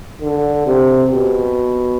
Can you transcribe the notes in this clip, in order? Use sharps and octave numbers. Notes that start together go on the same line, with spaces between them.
D3
C3
B2